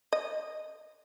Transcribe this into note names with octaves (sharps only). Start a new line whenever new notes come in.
D#5